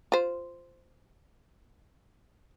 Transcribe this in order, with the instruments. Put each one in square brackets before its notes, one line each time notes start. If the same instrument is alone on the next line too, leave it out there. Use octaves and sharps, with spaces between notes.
[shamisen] F4 C5